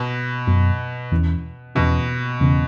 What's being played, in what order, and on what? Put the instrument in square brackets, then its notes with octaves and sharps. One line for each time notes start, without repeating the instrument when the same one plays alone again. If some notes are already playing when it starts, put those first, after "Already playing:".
Already playing: [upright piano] B2
[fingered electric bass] F#2 F#3 B3
E2 E3 C#4
[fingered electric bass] E2 E3 C#4 [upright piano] B2
[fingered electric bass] E2 C#3 E3 B3